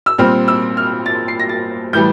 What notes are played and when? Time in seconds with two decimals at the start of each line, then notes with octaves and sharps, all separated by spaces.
0.06 E6
0.18 A#2 G3 C4 F6
0.48 E6
0.77 F6
1.06 A6
1.28 C7
1.39 A#6
1.49 A6
1.93 A2 E3 G3 G6